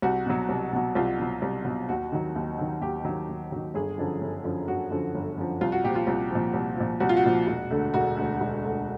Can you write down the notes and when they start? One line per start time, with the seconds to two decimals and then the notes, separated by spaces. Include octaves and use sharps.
0.02 C2 F#4
0.26 B2 F#3
0.49 C2
0.72 B2 F#3
0.95 C2 F4
1.19 B2 F#3
1.42 C2
1.65 B2 F#3
1.89 D#2 F#4
2.12 D#3 F#3
2.36 D#2
2.58 D#3 F#3
2.81 D#2 G4
3.05 D#3 F#3
3.29 D#2
3.52 D#3 F#3
3.74 G1 G#4
3.98 F#2 D3 F3
4.21 G1
4.44 F#2 D3 F3
4.68 G1 F#4
4.91 F#2 D3 F3
5.15 G1
5.38 F#2 D3 F3
5.61 C2 F4
5.72 F#4
5.84 A#2 F3 G4
5.95 F4
6.07 C2 F4
6.31 A#2 F3
6.54 C2
6.77 A#2 F3
7.00 C2 F#4
7.09 F4
7.17 F#4
7.24 A#2 F3
7.47 E1
7.71 D2 D3
7.94 E1 F#4
8.17 D2 D3
8.41 E1
8.64 D2 D3